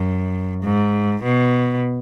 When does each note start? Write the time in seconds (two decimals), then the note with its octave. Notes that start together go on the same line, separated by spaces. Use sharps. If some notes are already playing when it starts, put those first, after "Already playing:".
Already playing: F#2
0.63 G#2
1.23 B2